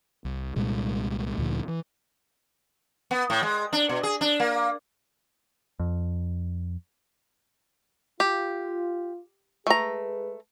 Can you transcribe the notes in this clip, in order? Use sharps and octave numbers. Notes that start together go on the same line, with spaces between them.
C2
C2 A#2 G3 G#3
D2 A#2 D3 F3
E3
B3
A2
G#3
D4
B2
G#4
D4
A#3
F2
F4 G4
G#3 A3 G#4 B4 A#5